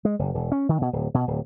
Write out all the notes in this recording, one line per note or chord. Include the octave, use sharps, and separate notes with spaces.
G#3
F#1
E1
C#4
D#3
B2
D1
B2
D1